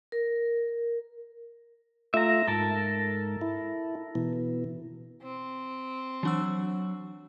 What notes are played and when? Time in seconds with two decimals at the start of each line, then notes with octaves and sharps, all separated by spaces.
0.12 A#4
2.14 A3 F4 E5 A#5
2.48 G#2 A4 A#4 A5
3.41 E4
4.15 B2 E3
5.22 C4
6.23 E3 F#3 D4 F#4 E6